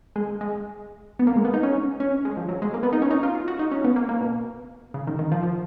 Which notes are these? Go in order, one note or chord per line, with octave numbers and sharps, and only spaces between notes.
G#3
G#3
B3
A#3
G#3
B3
D#4
C#4
C#4
G#3
F3
F#3
G#3
A#3
B3
D#4
C#4
D#4
F4
F4
F#4
D#4
C#4
B3
A#3
A#3
B2
C#3
D#3
D#3
F3
F3